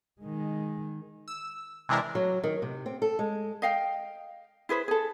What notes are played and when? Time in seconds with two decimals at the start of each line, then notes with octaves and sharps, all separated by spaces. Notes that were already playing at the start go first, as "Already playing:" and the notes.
0.21 D#3 G#3
1.28 E6
1.89 C3 E3 G#3 D4 E4 A#4
2.15 F#3
2.44 D#3
2.62 C3
2.86 C4
3.02 A4
3.19 G#3
3.62 D#5 F5 G5
4.69 E4 G#4 B4 C5
4.88 G#4 A4